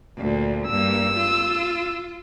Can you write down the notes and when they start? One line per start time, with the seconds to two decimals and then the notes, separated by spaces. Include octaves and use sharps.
0.17 D2 A#2
0.68 G2 A#3 E6
1.17 F4